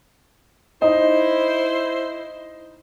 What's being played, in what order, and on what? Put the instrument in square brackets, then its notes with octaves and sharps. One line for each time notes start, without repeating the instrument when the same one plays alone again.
[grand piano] D#4 D#5 [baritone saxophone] E4 [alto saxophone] C5